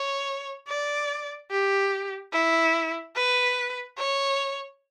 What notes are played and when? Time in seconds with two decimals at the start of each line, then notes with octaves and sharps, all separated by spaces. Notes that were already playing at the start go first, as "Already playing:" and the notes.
Already playing: C#5
0.68 D5
1.51 G4
2.33 E4
3.16 B4
3.97 C#5